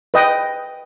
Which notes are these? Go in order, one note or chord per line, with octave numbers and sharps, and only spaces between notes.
B4 D#5 G5